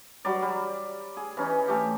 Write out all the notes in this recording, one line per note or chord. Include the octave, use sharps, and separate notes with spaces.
F#3 G3 D5
G3
G#4
E3 C#4 D#4
A3 G4